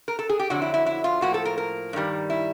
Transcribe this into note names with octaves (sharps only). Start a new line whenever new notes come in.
A#4
A4
G#4
G4
F2 D3 F#3 F#4
E4
E4
E4
F4
A2 F3 A#3 F#4
A4
A#4
A#4
G2 D#3 G3
E4